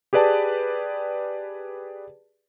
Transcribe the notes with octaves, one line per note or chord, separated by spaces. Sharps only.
G4 G#4 B4 D5 G5 A5